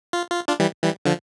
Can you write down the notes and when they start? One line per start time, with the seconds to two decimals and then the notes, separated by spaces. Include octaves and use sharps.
0.13 F4
0.31 F4
0.48 D4 F4
0.60 E3 G3
0.83 E3 G3
1.05 D3 F3